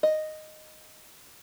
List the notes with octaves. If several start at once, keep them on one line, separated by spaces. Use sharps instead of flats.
D#5